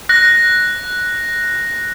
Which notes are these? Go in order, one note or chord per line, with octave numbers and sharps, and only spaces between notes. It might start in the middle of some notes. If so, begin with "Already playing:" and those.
F#6 A#6